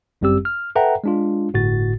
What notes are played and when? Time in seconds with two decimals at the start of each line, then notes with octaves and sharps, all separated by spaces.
0.21 G1 F#2 G3 C4 G4 E6
0.45 F6
0.76 A4 B4 E5 F#5 G5 A#5
1.04 G#3 D4 F4
1.53 G1 A2 F#4 A6